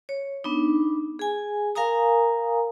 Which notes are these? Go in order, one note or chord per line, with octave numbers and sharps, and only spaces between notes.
C#5
B3 D4 D#4
G#4 G#5
A#4 F5 G#5 A#5 D#6